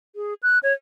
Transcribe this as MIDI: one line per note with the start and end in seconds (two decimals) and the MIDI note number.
0.16 0.34 68
0.43 0.59 90
0.63 0.73 73